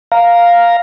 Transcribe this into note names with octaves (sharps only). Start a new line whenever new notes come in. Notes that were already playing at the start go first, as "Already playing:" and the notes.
F5 A#5